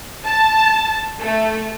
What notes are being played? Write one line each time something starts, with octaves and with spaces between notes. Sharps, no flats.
A5
A3